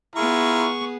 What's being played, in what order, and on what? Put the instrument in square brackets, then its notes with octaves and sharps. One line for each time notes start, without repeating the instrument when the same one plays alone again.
[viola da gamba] B3 G#4 [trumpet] E4 [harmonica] F4 A#5 F6 [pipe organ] C#6